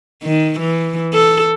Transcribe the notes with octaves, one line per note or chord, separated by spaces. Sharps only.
D#3
E3
A4